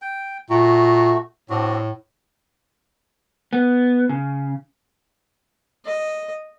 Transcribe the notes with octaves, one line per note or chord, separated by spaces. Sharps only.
G5
A#2 A3 F#4
A2 C4 D4 F#4
B3
C#3
D#5